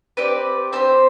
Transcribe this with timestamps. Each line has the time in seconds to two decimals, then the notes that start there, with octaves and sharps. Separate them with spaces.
0.17 C4 G4 B4 D5
0.72 C4 G4 A4 C5